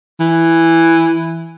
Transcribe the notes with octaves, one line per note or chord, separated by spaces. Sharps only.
E3